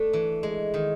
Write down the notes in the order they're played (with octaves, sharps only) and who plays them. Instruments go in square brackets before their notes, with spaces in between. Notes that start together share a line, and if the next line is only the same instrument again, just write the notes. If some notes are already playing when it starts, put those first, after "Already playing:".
Already playing: [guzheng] A3 D4
E3
G#3
D#3